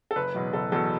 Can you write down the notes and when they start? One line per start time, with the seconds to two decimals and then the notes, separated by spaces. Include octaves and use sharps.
0.11 A4
0.16 F#1 B4
0.35 E2 B2 F#3
0.53 F#1 A4
0.72 E2 B2 F#3 A4